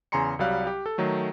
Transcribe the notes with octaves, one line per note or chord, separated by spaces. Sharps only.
E2 C#3 G#5 A#5 C6 C#7
C2 F#3 G3 F5 F#6
G4
A4
D#3 F#3 A3